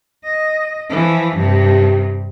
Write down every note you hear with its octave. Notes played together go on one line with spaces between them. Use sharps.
D#5
E3 F3
G2 C3